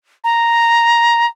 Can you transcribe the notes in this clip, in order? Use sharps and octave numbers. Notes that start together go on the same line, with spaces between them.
A#5